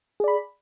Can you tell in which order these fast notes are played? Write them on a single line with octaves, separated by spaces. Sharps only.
G#4 D5 B5